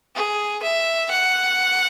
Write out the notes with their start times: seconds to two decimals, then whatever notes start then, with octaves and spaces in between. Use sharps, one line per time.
0.16 G#4
0.63 E5
1.11 F#5